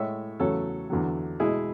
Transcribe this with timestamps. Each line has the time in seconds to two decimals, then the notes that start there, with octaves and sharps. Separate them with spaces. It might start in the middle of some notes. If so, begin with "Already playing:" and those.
Already playing: A2 G#3 C#5 E5
0.40 E2 C#3 F#3 A3 A4 C#5
0.90 E2 D3 F#3
1.40 B2 G#3 E4 G#4